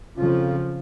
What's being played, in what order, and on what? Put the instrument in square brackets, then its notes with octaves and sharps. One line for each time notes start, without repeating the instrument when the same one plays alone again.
[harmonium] F2 F4 [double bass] C#3 F3